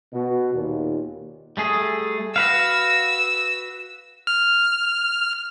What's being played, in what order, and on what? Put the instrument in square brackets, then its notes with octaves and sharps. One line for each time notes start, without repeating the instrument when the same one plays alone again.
[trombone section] B2
D#2 A#2
[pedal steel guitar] G3 A3 G#4
[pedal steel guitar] F#4 B4 F5 [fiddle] E6
[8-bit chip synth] F6